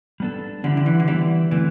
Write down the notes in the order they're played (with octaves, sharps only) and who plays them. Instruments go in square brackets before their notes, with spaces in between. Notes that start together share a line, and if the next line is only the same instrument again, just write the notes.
[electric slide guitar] G3 B3 D4 A4
[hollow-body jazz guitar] D3 [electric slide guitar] G3 B3 E4 G4 D5
[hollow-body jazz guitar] D3
E3
D3
[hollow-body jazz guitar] E3 [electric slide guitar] G3 B3 E4 G4 D5
[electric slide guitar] D3 A3 C4 [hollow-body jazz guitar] E3